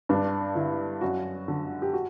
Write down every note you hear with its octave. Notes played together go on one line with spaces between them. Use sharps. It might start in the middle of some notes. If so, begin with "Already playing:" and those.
G2 D4
D3 E4
F#2 F#4
D3
G4
F#4